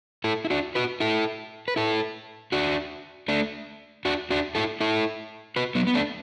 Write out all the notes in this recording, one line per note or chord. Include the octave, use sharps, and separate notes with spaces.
E4 A4
E4
D4 F#4
F#4 B4
E4 A4
B4
E4 A4
D4 F#4
A3 D4
D4 F#4
D4 F#4
E4 A4
E4 A4
F#4 B4
F#3 B3
B3
A3 D4